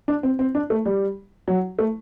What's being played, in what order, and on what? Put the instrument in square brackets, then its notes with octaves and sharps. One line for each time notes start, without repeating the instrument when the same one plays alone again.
[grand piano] D4
C4
C4
D4
A3
G3
F#3
A3